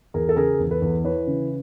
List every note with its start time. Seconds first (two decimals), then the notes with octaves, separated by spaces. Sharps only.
0.14 E2 G#4 A#4
0.29 A4
0.36 C#3 G#4 A#4
0.59 E2
0.71 A4 B4
0.82 E2
1.04 E3 B4 C#5
1.27 C#3